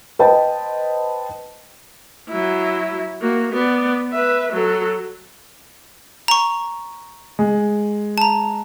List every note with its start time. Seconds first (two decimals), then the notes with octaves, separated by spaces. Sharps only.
0.19 B4 C5 D#5 G5 A5
2.29 F#3 E4
3.21 A#3 F#4
3.53 B3 D5
4.12 B4 E5
4.53 F#3 A4
6.28 A#5 C#6
7.39 G#3
8.18 A5 A#5